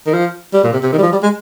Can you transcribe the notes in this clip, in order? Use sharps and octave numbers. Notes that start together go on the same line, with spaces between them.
D#3
F3
G3
A#2
C3
C3
D#3
G3
F3
G3
G#3